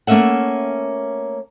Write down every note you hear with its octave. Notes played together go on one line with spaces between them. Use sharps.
A3 A#3 C#4 D#5 E5 F#5